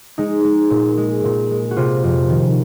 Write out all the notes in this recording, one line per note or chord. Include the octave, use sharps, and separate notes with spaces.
G#3 D#4
G#3
A#2
G#3
A#2
G#3
F#4
C3 F4
F2
D#3